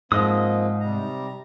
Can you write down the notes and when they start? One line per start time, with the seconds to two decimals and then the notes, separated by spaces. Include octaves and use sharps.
0.12 G#2 F3 A#3 C4 D#5 D#6
0.80 C3 G3 A#5